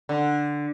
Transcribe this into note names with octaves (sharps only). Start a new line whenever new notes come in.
D3